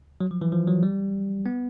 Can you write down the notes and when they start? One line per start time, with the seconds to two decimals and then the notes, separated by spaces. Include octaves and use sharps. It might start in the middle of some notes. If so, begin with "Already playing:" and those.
0.21 F#3
0.31 F3
0.42 E3
0.52 F3
0.68 F#3
0.83 G3
1.46 B3